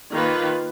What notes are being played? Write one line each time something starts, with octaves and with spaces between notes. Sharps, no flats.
D#3 A#3 F4 B4